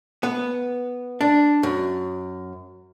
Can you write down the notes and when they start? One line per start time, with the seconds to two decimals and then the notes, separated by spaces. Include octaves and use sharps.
0.23 B3
1.21 D4
1.63 F#2